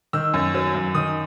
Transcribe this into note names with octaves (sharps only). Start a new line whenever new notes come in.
D#3 E6
F#2
F#3
F#2
D#3 D#6